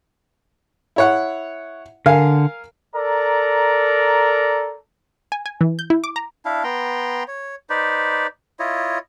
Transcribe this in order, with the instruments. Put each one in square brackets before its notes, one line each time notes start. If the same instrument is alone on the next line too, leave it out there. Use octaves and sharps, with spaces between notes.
[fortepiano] E4 C#5 F#5
[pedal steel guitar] D3 [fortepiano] A#4 F5 G#5
[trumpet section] A4 A#4 D5 A#5
[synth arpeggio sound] G#5
G#5
E3
G6
E4
D6
A#5
[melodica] D4 E4 F5
B3 G5 A#5 C6
C#5
D#4 B4 C5 D5
E4 F4 C#5 D#5